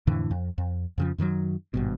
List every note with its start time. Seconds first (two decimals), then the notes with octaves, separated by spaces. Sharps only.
0.07 F2 A2 D3 E3
0.31 F2
0.58 F2
0.98 F2 C#3 F3
1.18 F#2 D#3 F3 F#3
1.74 G#1 G2 B2